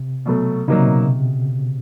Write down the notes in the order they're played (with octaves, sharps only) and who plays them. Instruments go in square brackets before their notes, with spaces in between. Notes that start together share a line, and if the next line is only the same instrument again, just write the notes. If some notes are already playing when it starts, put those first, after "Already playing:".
Already playing: [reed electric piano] C3
[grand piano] B2 F#3 A3
[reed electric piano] C#3 [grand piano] F#3 A#3 D#4
[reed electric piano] C3
B2